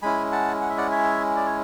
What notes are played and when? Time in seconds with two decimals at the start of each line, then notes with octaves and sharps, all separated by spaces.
0.02 G#3 C#4 E4 G#5 B5
0.32 F#5 A5
0.62 F#5
0.70 E5
0.78 D5 F#5
0.91 C#5 E5
1.36 D5
1.46 C#5